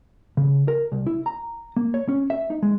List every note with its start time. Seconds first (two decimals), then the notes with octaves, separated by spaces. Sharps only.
0.37 C#3
0.68 A#4
0.92 C2
1.07 E4
1.26 A#5
1.77 A#3
1.94 C#5
2.09 C#4
2.30 E5
2.50 D#4
2.63 G#3